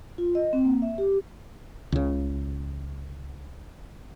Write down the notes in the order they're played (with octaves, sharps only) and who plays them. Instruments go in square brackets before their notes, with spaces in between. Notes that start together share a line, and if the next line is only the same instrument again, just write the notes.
[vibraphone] F4
D#5
C4
A#3
E5
G4
[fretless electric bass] C#2 C#3